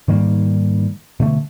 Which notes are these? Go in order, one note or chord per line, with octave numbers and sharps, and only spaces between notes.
G#2 D#3 G3 A#3
B2 D3 A3